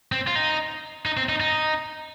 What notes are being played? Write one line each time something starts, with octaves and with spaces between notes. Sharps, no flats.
C4
F4
D#4
D#4
C4
D#4
D#4